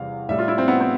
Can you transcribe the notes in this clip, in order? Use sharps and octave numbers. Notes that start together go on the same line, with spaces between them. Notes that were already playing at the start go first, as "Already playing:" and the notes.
Already playing: E2 C3 G3 F5
A2 G3 E5
F4
E4
C4
B3
C4